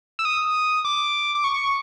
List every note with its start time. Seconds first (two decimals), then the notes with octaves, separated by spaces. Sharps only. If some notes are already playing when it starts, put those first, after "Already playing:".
0.19 E6
0.25 D#6
0.85 D6
1.35 D6
1.44 C#6